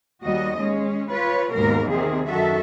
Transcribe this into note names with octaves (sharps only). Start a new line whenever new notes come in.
D#2 G3 F#4 D#5
G#3 C#4
F4 B4 C#5
D#2 G#2 B2 A#3 A#4
C3 D#3 C4 G#4
F#2 D#3 F#4 A4 E5